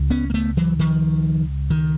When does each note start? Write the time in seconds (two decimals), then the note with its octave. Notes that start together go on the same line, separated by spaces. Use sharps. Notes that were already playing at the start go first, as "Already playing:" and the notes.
Already playing: C#2
0.10 B3 C#4
0.30 A#3
0.34 A3 B3
0.57 E3 F#3
0.79 D#3 F3
1.70 D#3